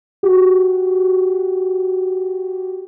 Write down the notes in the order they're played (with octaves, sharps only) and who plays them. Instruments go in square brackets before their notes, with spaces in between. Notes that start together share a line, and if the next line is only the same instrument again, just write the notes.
[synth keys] F#4 G4